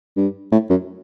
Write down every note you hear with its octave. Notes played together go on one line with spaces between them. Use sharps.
G2
A2
F#2